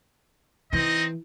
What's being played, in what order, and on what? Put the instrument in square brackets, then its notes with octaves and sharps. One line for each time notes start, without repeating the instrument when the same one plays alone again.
[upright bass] E3 [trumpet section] C4 D#4 D#5